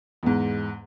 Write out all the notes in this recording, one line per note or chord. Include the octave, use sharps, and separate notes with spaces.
E2 G#2